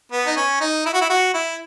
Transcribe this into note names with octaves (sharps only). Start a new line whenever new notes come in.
B3
D#4
C#4
D#4
E4
F#4
E4
F#4
E4